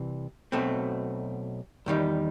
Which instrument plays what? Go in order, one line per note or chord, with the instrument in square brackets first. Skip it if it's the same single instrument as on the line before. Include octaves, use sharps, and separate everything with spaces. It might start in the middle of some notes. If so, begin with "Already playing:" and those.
Already playing: [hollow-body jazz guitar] C2 C3 E3
B1 B2 A3 C4
E2 D#3 G3 D#4